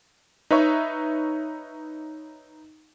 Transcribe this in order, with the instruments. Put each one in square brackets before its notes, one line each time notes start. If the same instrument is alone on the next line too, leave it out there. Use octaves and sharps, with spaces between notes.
[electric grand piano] D#4 B4 C#5 E5 C#6